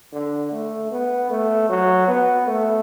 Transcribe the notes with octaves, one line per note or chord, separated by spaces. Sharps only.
D3
A3
B3
A3
F#3
B3
A3